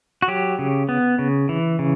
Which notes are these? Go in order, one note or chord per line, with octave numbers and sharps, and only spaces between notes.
F#4
F#3 G4
C#3
B3
C#3
E3
C#3